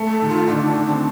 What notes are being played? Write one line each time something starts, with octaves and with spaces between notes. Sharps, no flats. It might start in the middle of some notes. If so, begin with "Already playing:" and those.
Already playing: A3
A4
D#3
F4
D3 D4 D#4
D#3
C4